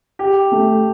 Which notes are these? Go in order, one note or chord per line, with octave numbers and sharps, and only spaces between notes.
G4
A3